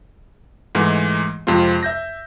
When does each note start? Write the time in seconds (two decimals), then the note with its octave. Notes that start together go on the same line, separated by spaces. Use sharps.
0.75 G#2 E3 G#3 A3
1.47 F2 C3 G#3 C4 F4
1.83 E5 G6 A#6